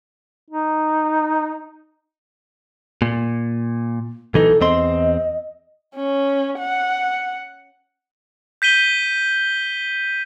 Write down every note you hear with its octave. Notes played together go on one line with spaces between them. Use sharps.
D#4
A#2
B1 E3 D#4 A4
E2 C4 D#5 C6
C#4
F#5
G6 B6 D#7 G7